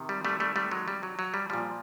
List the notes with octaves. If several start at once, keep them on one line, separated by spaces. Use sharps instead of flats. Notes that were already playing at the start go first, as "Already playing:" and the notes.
Already playing: C3 D#3
G3
G3 A3
G3 A3
G3 A3
F#3 G#3
G3
F#3
F#3
G3
A#2 F3 G3